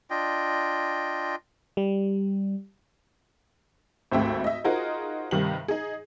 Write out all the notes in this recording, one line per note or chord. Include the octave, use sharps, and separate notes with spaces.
D4 F4 D#5 G5
G3
G#1 D2 A3 C4 G4 E5
D#5 E5
D#4 F4 F#4 G#4 A#4 C5
G2 C3 D#3 F#7
D#4 G#4